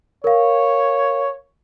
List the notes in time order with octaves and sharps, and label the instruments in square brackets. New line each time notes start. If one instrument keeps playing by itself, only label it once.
[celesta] A#4 F5 [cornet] C#5